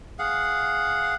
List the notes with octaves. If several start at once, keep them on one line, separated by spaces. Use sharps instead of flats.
G#4 F5 F#5